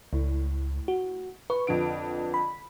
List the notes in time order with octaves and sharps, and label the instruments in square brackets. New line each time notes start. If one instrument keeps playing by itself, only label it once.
[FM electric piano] C#2 [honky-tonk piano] A2
[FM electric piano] F#4
[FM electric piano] B4 [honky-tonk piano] C#6
[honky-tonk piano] F2 D3 D7
[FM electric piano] B5